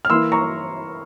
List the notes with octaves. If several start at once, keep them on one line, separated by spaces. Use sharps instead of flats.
F6
E3 A#3 E4 C6 E6
A#5 C#6